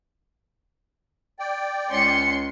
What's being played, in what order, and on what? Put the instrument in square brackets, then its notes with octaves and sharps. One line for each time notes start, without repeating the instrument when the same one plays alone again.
[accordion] D5 G5
[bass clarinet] C#2 [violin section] C#4 C6 C#7